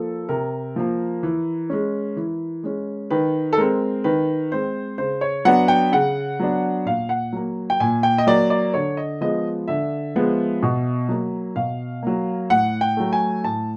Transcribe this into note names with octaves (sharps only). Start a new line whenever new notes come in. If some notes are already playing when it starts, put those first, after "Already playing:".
Already playing: F3 A#3 A4
C3 A#4
F3 A#3
E3
G#3 C#4
E3
G#3 C#4
D#3 B4
A4
G#3 C4 A#4
D#3 B4
G#3 C4 C5
C#3 C5
C#5
F#3 B3 D4 F#5
G5
C#3 F#5
F#3 B3 D4
A#2 F5
F#5
F#3 A#3
G5
A#2 G#5
G5
D#5
F#3 A#3 D5
D5
D3 C#5
D#5
F3 G#3 B3 D#5
D3 E5
F3 G#3 B3
B2
F#3 A#3
B2 F5
F#3 A#3
A2 F#5
G5
F#3 A3
G#5
A2 A5